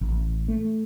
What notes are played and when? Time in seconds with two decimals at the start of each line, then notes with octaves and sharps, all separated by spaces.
0.01 A1
0.48 A3